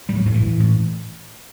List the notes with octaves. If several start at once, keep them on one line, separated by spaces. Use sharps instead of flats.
A2 G3
F#3
A2 F3
E3
A2
A2